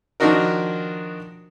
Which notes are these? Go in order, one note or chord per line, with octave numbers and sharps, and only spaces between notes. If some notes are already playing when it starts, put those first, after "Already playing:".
D#3 F3 D4 D#4 F#4 A#4